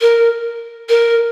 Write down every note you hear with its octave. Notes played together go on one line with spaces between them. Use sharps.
A#4
A#4